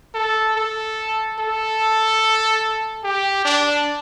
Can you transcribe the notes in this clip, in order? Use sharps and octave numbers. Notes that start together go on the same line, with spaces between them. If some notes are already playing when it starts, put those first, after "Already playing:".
A4
A4
A4
G4
D4